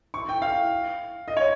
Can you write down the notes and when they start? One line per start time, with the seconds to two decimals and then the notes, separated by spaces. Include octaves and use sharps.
0.14 C#6
0.29 G5
0.42 F5
1.28 D#5
1.37 C#5